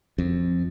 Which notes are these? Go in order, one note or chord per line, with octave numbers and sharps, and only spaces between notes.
F2